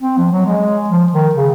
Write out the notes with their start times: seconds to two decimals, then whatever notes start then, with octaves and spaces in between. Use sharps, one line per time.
0.01 C4
0.17 F3
0.31 F#3
0.45 G#3
0.90 F3
1.12 D#3
1.35 C#3